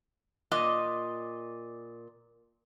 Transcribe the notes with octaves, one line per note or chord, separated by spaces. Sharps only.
A#2 D#5